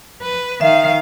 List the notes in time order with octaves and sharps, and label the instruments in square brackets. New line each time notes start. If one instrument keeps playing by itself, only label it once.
[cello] B4
[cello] D#3 F5 [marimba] E5